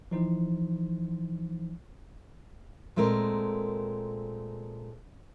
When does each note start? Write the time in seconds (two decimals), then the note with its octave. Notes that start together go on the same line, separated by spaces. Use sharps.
0.11 E3 F3 D#4 C5
2.96 A#2 G#3 A3 C4 A#4